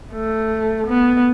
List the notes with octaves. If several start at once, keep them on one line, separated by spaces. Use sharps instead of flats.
A3
B3